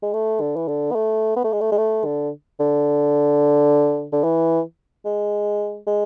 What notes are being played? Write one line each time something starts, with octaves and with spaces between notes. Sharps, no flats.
G#3
A3
D3
E3
D3
B3
A3
B3
A3
G#3
A3
G#3
A3
D3
D3
D3
E3
G#3
G#3